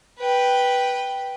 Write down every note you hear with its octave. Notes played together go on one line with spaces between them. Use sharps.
B4 G5